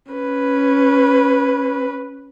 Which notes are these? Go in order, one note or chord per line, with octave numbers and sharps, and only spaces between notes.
C#4 B4